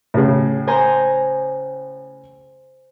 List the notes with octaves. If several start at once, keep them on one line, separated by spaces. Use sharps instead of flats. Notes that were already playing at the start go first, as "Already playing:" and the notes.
A2 C#3
C5 G#5 A#5